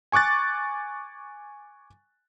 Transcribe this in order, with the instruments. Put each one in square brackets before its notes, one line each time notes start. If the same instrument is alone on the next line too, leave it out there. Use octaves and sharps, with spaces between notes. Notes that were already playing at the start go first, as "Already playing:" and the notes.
[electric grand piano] G#5 C#6 D6 F#6 A6